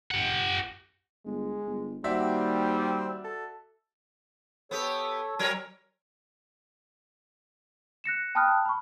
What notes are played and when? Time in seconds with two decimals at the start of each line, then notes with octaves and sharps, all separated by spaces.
0.11 G4 F#5
1.25 G1 G#3
1.67 G1
2.04 D#2 G3 C4 F#4 D5 E5
3.24 A4
4.71 B3 G4 A4 C#5
5.39 F#3 A#4 C#5
8.04 F#6 A#6 C#7 E7
8.35 G5 A5 B5 D#6 F6 F#6
8.66 B5 C#6